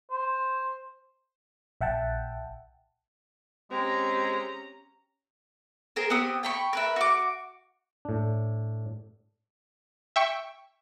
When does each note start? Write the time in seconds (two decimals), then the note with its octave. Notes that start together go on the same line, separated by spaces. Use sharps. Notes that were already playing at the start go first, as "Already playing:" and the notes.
0.11 C5
1.81 A#1 E5 F#5 G5 A5
3.71 G#3 C4 C#4 G4 A#5
5.96 G#4 A#4 C5
6.10 B3 C4 G4 D#6
6.43 G5 B5 C#6
6.73 A#4 B4 E5
6.96 F#4 D6
8.05 A2 D4
10.16 E5 G5 C#6